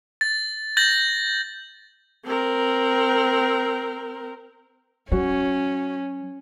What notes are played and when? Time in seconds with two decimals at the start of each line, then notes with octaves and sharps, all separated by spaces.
0.21 A6
0.77 G6 A6 A#6 F#7
2.26 C4 A#4
5.12 F#3 C#4 F#4